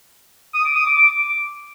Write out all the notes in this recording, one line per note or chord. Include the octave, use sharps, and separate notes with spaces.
D#6
D6
D#6
D6
D6